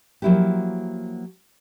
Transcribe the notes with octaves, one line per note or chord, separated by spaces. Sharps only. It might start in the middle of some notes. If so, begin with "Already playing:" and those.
F3 F#3 A#3 E4 F#4 G4